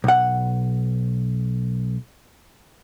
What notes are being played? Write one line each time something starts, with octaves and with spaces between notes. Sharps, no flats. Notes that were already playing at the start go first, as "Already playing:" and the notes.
B1 F#5